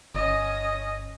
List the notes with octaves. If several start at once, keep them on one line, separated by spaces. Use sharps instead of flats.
G1 C#4 D#5